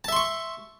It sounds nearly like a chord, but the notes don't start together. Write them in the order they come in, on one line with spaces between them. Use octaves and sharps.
A5 E5 C6 C#6